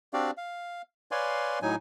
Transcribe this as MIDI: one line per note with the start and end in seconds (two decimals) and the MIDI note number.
0.13 0.31 60
0.13 0.31 62
0.13 0.31 66
0.13 0.31 67
0.13 0.31 74
0.13 0.31 77
0.37 0.82 77
1.11 1.59 71
1.11 1.59 73
1.11 1.59 74
1.11 1.59 77
1.11 1.59 80
1.11 1.59 84
1.62 1.76 45
1.62 1.76 54
1.62 1.76 63
1.62 1.76 80